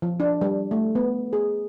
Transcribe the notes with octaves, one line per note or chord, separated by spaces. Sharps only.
F3
D4
G3
A3
B3
G#4